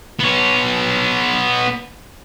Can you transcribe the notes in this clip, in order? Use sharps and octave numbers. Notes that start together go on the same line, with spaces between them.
B3 C#5